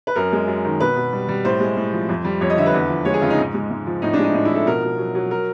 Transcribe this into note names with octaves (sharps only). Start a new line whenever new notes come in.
B4
F#2 A#4
G#3
F#2
D#3
B2 B4
B2
G3
G3
A2 C5
G#3
A2
F3
F2
G3
F2 C#5
D#5
D3 E5
B4
E2
F3
G#3 C#5
G#4
C#3 F4
D#4
G#2
G#3
G#2
F3
A2 D#4
D4
G#3 D#4
A2 D#4
E4
F3 A4
B2 A#4
B2
F#3
F#3
A#4